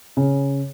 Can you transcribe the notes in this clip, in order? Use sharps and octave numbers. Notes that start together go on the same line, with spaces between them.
C#3